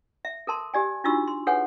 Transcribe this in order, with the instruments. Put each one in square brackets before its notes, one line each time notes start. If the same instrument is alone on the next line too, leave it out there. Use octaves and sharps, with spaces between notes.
[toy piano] E5
A4 A#4 A5 C6
G4 D5 G#5
D4 D#4 F4 F#4 C#6 E6
C6
G#4 A4 B4 C#5 F#5 G#5